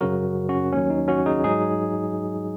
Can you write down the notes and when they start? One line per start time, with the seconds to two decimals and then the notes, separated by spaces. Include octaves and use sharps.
0.01 F#2 C#3 F#3 F#4 A#4
0.49 C#4 F#4
0.72 D#2 D#3 F#3 C#4
0.90 D#4
1.08 C#4 F#4
1.26 D#4 G#4
1.44 G#2 F#3 D#4 G#4